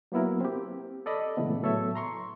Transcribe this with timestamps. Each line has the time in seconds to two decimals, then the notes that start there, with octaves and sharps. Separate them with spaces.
0.12 F#3 A#3 B3 E4 A#4
0.41 C4 G4
1.06 A4 D5 D#5 B5
1.37 A#2 C#3 E3 G#3 A3 B3
1.61 A2 F#3 B3 A4 C#5 E5
1.95 A#5 C6 C#6